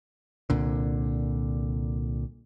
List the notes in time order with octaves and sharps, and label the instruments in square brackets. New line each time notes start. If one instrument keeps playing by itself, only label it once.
[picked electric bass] C2 A#2 D3